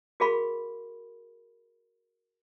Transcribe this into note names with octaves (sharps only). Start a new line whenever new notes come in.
F#4 G#4 A#4 F5 B5 C#6